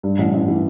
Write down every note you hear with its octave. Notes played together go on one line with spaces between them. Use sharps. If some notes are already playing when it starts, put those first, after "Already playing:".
G2
A1
A1
E3